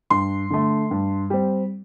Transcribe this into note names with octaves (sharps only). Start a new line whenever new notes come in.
G2 C6
D3 A3
G2
G3 C4